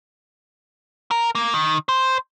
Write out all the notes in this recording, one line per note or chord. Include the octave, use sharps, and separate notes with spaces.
A#4
A#3
D#3
C5